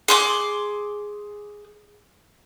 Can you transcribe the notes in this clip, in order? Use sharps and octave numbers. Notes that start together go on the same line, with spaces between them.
G#4 C6 D6